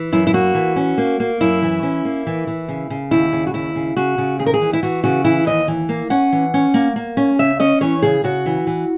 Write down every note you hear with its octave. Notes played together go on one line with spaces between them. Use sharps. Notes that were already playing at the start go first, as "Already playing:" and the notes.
Already playing: E3
F#2 E4
E4
A#3 F#4
E3
C#4
A#3
A#3
F#2 E4
E3
C#4
A#3
E3
E3
C#3
C#3
D#2 E4
C#3
F#4
D#2 E4
C#3
C#3 F#4
C#3
D#2 G#4
A#4
G#4
E3
E4
E3 F#4
C#3 F#4
E3 E4
D#2 D#5
E3
A#3
C#4 F#5
E3
C#4
A#3
A#3
C#4
C#3 E5
C#4 D#5
E3 C#5
C#3 G#4
C#3 F#4
E3
E3